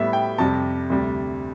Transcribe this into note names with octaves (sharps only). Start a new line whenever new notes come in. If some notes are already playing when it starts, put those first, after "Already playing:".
Already playing: A2 G3 B3 E5
G5
F2 C3 G3 A5
D2 C3 G3